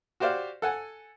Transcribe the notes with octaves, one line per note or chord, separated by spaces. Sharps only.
F#4 G4 C5 D5 F5
A4 F#5 G#5